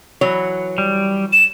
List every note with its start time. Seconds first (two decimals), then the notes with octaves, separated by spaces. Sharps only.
0.21 E3 F#3 C#5
0.78 G3
1.33 E7